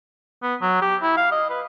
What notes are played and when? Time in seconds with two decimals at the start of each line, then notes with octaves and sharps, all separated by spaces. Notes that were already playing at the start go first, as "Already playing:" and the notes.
0.43 B3
0.62 F#3
0.82 G4
1.02 E4
1.17 F5
1.32 D#5
1.50 B4